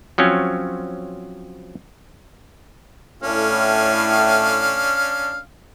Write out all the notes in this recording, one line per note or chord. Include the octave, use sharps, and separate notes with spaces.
F3 F#3 C4 C#4
A2 C#4 D4 F5